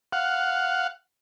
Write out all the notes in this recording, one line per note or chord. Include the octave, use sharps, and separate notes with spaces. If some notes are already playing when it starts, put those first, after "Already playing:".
F5 F#5